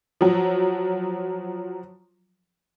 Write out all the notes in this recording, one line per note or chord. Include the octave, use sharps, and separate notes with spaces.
F3 F#3